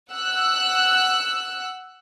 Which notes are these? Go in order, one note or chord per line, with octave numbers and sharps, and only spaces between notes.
F#5 E6 F#6